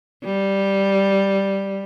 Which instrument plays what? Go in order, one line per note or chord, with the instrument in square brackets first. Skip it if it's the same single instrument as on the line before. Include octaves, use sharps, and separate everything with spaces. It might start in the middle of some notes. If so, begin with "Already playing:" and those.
[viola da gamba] G3